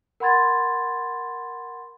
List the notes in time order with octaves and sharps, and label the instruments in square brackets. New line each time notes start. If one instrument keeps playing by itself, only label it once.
[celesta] A#4 F#5 B5 C6 G#6 A6